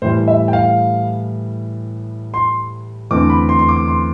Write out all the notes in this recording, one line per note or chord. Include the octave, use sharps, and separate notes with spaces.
A2 E3 G3 C5
E5
G5
F5
C6
E2 D3 A3 C4 D6
B5
C6
C6
D6
C6